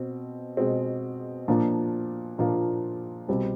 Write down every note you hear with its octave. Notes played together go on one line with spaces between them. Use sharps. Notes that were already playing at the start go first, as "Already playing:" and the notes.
Already playing: B2 C4
B2 G#3 C4
A#2 F3 A#3 D4 F4
A#2 F3 A#3 D4 F4
C2 B2 G3 C4